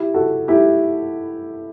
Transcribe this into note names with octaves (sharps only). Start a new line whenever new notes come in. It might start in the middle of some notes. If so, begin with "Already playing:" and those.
Already playing: E4 G4
F#4 A4
E4 G4